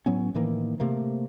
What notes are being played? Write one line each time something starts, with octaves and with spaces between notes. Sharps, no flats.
A2 F#3 B3 C#4
A2 D#3 E3 A#3
C3 A3 A#3